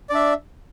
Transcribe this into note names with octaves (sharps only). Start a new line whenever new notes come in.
D4 D5 E5